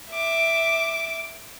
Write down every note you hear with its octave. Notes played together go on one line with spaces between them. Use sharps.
E5 D6